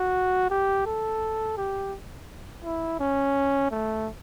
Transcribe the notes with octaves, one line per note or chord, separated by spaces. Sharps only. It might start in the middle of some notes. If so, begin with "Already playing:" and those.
Already playing: F#4
G4
A4
G4
E4
C#4
A3